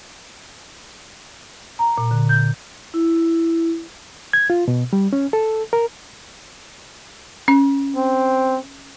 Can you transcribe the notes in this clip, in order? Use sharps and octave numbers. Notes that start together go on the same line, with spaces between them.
A#5
A#2
D3
G6
E4
G#6
F4
B2
G3
C#4
A4
A#4
C#4
C4